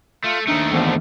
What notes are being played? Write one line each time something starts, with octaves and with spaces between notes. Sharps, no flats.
A3 F4
D#2 A3 D4 D#4
G#2 D3 E3 F3 B3 D4